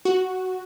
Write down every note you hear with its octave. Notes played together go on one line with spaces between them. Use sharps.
F#4